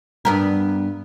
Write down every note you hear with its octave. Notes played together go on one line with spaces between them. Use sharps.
G2 B3 A#4